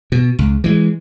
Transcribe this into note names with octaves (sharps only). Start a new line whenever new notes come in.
B2
C#2
E3 G#3